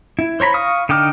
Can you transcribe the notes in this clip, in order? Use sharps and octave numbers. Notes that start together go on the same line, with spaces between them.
E4
C5 C#5 A#5 B5
F5 C#6 D#6
D3 D#4 G5 D6 F6